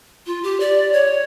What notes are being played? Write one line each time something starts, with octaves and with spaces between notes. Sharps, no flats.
F4
G4
D5
C#5